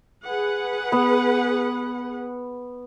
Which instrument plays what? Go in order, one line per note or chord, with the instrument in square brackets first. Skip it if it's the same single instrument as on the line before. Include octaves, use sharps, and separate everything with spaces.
[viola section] G#4 B4 F#5
[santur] B3